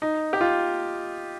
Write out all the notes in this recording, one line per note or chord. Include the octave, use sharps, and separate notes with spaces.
D#4
G4
F4